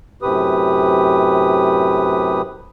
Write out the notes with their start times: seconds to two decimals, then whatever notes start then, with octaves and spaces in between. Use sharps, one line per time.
0.22 F#2 A2 C3 G4 B4 D#6